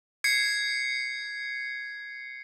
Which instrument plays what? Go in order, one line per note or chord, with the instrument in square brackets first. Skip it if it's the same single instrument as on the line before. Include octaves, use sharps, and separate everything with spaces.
[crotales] G#6 C7 C#7